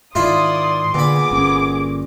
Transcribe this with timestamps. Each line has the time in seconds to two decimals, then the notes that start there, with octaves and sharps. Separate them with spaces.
0.15 G#2 D#3 E4 F4 D5 E5 C6 D#6
0.95 A#2 D3 B3 G#4 B5 D6
1.31 G1 A#3 C#4